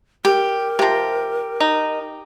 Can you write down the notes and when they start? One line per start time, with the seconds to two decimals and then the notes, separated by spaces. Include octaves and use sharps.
0.25 G4 A#4
0.79 C3 F3 G4 A#5
1.60 D#4